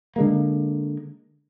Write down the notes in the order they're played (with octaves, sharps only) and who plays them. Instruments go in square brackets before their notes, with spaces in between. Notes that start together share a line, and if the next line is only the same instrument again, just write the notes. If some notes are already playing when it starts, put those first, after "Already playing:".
[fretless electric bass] D3 G#3 A#3